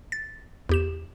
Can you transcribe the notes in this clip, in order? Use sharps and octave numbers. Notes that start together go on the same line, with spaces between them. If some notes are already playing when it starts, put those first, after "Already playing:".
A6
E2 G4 E7